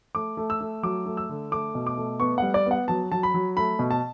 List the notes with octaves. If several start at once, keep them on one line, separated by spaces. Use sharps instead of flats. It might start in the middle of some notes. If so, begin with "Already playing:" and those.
A3 D6
A3
E6
A3
F#3 D6
A3
E6
D3
A3 D6
B2
D6
A3
B3 C#6
G3 F#5
D5
B3 F#5
F#3 A5
F#3 A5
B5
F#3
A3 B5
B2
A5